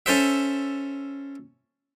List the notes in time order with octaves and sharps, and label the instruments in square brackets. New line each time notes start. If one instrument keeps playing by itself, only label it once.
[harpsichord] C#4 A4 C5 E5